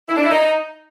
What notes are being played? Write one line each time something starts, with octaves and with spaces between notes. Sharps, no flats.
E4
D4
E4
D#4